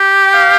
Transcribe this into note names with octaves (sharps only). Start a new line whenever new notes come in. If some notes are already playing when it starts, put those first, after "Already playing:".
Already playing: G4
G5
F5